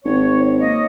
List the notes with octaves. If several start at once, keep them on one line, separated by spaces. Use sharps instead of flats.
G#1 C#5
A#3 C#5 D#5